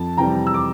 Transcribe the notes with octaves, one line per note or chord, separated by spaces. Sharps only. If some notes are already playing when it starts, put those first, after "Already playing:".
Already playing: F2 A5
C3 E3 G3 G5 A#5
E6
D6